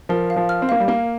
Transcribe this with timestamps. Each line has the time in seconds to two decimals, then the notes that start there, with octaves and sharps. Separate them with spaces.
0.09 F3 A#4
0.30 F5
0.36 F3
0.49 F6
0.62 C4
0.69 A#3 F5
0.80 G3
0.88 A#3 A#4